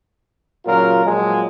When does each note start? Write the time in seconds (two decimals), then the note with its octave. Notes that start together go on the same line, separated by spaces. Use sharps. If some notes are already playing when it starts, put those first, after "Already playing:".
0.65 A#2 C#3 F#3 F4 A#4
1.04 A#2 F3 F#3 G#3